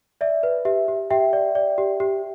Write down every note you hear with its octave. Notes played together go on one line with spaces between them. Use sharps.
D5 E5
B4
G4 E5
G4
G4 E5 G5
D5
D5
G4
G4